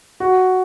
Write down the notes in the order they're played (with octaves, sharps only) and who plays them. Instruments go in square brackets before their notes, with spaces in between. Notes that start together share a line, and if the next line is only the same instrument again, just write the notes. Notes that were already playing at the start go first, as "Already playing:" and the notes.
[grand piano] F#4